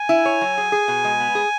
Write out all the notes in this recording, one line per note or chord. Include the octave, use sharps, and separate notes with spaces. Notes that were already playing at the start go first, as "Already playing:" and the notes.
Already playing: G#5
E4
C#5
F#3
G#4
G#4
B2
G#3
B3
G#4